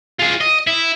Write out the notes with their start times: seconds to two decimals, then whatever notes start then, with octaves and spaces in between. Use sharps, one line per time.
0.19 F4 G#4
0.41 D#5
0.67 E4